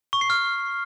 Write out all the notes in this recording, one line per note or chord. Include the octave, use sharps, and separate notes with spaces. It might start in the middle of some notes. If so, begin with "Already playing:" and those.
C#6
C7
F6